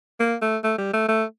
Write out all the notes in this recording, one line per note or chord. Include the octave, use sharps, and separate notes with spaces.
A#3
A3
A3
G3
A3
A3